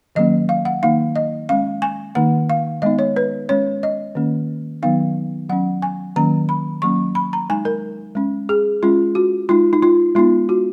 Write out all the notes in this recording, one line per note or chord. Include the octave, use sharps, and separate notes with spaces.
D#3 F#3 A#3 C#4 D#5
F5
F#5
D#3 A#3 D#4 F5
D#5
G#3 C#4 F5
G#5
D#3 A#3 D#4 F#5
F5
G#3 B3 D#4 D#5
C#5
B4
G#3 C#4 C#5
D#5
D#3 A#3 C#4
D#3 F#3 B3 D#4 F5
F#3 C#4 F#5
G#5
D#3 F#3 A#3 C#4 A#5
B5
F#3 A#3 C#4 C#6
B5
A#5
G#3 D#4 G#5
A#4
G#3 C#4
G#4
G#3 C#4 F4
F#4
G#3 D#4 F4
D#4
F4
G#3 B3 D#4 F4
F#4